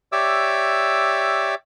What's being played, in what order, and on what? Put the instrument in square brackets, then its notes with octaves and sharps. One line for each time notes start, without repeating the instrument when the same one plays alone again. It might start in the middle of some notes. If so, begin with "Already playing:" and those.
[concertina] G4 C#5 D5 E5 D6 E6